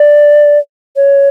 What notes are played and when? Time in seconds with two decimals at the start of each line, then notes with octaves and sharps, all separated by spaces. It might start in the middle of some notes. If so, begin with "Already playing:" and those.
Already playing: D5
0.96 C#5